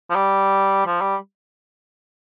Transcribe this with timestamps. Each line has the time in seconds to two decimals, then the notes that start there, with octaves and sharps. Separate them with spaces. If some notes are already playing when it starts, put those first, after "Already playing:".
0.10 F3
0.15 G3
0.86 F3
1.01 G3